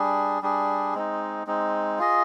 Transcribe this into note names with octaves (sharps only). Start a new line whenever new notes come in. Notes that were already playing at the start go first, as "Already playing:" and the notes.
Already playing: G3 D4 G#4
G3 D4 G#4
G#3 C4 D#4
G#3 C4 D#4
F4 G#4 D#5